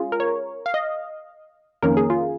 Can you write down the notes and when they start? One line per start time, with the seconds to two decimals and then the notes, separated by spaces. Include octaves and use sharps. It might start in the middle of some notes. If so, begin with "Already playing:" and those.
Already playing: G#3 C#4 F4 G#4
0.12 A#4
0.20 C#5
0.66 F5
0.74 D#5
1.83 F2 D#3 A#3 C#4 A#4
1.97 G#4
2.10 F4